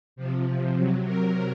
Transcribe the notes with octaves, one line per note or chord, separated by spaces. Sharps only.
C3 F3
C3 F#3
A#4